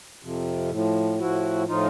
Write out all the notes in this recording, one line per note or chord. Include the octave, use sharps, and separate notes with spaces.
F2 C3 F3
A2 F3
A2 F3 E4 F#4
A2 F3 D#4 F4